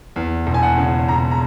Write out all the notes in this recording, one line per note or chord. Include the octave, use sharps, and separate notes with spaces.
E2
E1
G#5
F#5
C#3
E1 A#5
A#5